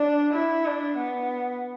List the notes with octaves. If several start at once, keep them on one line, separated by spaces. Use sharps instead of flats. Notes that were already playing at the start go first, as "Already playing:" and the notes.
Already playing: D4
E4
D4
B3